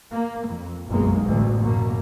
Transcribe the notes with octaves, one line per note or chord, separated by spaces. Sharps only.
A#3
F2
F1 B1 F#2 G#3 A#3
A1 D2 B2
F#2 B2 A#3